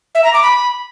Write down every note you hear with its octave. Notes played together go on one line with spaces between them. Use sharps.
E5
A#5
D6
B5